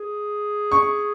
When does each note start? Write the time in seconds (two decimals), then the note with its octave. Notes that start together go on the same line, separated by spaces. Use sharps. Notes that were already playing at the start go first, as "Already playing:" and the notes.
Already playing: G#4
0.72 C#6